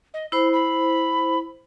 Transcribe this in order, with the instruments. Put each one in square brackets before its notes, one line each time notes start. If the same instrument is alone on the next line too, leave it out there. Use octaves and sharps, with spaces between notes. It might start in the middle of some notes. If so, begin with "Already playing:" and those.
[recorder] D#5
[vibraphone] E4 C5 [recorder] B5
[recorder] B5